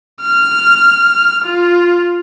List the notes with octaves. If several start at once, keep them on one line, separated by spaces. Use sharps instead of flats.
F6
F4